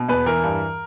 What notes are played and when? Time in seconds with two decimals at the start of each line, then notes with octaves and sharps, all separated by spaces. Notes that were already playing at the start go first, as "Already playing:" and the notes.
Already playing: B2
0.09 E2 B4
0.26 E3 A#4
0.43 G2